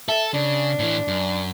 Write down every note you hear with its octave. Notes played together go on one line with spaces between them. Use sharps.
A4 E5
C#3 D4
A2 E3
F#2